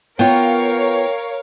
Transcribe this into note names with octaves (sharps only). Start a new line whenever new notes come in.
B3 F4 A#4 C#5 F5 G5